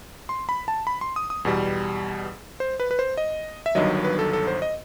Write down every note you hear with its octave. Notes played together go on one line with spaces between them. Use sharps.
C6
B5
A5
B5
C6
D#6
D#6
E2 B2 G3
C5
B4
B4
C5
D#5
E5
G1 G2 D#3 F#3 D#5
B4
A4
A4
C5
D#5